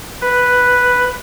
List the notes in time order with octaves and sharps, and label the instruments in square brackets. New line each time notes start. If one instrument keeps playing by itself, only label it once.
[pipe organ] B4